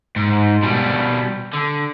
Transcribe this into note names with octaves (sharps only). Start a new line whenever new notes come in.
G#2
B2 G3
D3